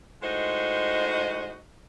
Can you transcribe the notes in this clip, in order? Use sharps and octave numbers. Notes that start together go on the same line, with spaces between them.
A2 G#3 D#4 F#4 C5 D#5